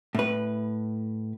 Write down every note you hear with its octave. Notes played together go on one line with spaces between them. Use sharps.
A2 B4